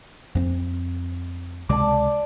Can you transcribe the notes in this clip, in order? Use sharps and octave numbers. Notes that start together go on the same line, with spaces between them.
F2 B3 C4
C#2 C3 G#3 D5 A5